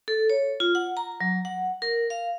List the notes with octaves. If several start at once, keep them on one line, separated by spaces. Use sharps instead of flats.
A4
C#5
F4
F#5
A#5
F#3
F#5
A#4
F5